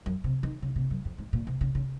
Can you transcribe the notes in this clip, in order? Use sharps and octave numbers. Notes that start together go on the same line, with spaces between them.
F#2
C3
D#3
C#3
C3
F#2
F2
G#2
A#2
C3
C#3
C#3